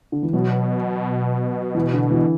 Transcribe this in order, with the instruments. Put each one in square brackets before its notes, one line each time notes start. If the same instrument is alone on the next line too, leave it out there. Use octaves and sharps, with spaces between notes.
[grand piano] D3
E3
[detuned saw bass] B2 [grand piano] F#3
[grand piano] E3
D3
E3